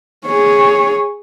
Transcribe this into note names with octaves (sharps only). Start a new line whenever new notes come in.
G#4 C#5